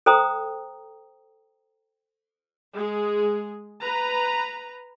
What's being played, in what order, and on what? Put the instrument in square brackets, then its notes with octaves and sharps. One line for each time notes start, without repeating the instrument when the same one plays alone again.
[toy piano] A4 C5 G5 A#5 D#6
[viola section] G#3 G#4
B4 A#5